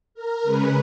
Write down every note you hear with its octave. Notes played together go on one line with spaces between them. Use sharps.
A#4
C#3 G#3 C#4 B4